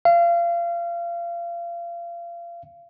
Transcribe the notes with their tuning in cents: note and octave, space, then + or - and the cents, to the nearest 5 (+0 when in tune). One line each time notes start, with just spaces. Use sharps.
F5 -30